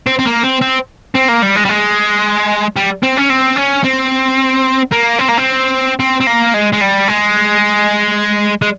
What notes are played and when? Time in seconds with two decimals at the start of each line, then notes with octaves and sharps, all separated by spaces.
0.07 C4
0.19 C4
0.26 A#3
0.43 C4
0.61 C4
1.15 C4
1.28 A#3
1.42 G3
1.56 G#3
1.65 G3
1.69 G#3
2.77 G3
3.03 C4
3.18 C#4
3.30 C4
3.57 C#4
3.85 C4
4.92 A#3
5.19 C4
5.29 A#3
5.37 C4
5.99 C4
6.20 C4
6.27 A#3
6.54 G#3
6.72 G#3
6.81 G3
7.08 G#3
8.62 G#3